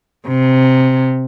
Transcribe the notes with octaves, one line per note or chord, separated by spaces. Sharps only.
C3